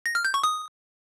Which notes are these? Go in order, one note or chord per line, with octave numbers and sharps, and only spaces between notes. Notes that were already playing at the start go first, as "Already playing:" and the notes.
A#6
F6
G6
C#6
D#6